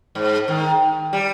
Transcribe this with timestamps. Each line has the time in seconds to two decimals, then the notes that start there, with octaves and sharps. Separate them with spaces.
0.15 G#2
0.48 D#3
1.13 G3